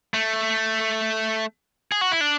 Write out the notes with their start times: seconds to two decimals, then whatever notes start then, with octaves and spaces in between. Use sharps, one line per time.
0.14 A3
1.92 G#4
2.01 F#4
2.12 E4
2.21 D4